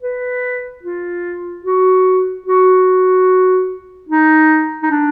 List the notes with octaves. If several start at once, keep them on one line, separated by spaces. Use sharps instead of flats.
B4
F4
F#4
F#4
D#4
D#4
D4